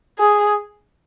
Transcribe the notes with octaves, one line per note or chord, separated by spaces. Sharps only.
G#4